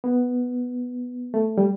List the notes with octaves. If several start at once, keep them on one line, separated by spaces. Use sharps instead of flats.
B3
A3
G3